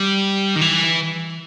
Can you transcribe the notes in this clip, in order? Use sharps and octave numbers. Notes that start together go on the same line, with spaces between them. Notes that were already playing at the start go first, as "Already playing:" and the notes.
Already playing: G3
D#3
E3